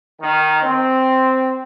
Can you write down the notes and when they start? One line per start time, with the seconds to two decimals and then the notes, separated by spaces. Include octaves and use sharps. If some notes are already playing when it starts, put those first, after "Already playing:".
0.22 D#3
0.63 C4